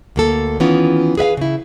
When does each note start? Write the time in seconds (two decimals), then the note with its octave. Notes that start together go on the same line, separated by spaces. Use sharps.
0.16 D2 A#3 A4
0.60 D#3 E3 B3 C#4 F4
1.17 G#4 B4 E5 F5
1.37 C#3 E4